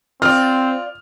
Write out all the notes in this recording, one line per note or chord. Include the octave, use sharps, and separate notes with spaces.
C4 F4 D5 F6